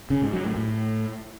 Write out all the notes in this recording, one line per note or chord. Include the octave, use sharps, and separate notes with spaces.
C#3
G#2
F#3
A2
A2